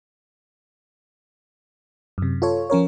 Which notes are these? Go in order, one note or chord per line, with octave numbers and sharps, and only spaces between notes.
F#2 C3
F4 A4 C#5
F3 C#4 A#4 C#5